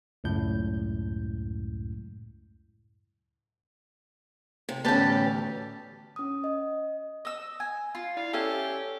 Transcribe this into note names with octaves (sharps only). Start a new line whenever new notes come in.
C#2 F#2 A2 G6
C3
A1 D2 B3 C#4 G4 A5
C#4 D#6
D#5
D#5 E6
G#5
F4
E4 D5 F5
C#4 G4 A4 C#5 E5 G#5 A5